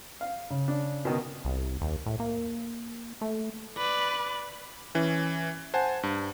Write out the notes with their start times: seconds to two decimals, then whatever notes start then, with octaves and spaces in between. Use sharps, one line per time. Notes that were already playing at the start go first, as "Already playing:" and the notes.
0.21 F5
0.50 C#3
0.68 D4
1.05 B2 D#3
1.45 C2
1.81 D#2
2.06 A2
2.20 A#3
3.21 A3
3.78 B4 D5
4.95 E3 C#4
5.74 C5 F#5 G#5 A5
6.03 G2